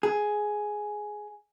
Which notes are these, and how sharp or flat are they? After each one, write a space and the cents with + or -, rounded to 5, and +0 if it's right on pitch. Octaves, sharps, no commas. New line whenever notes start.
G#4 +10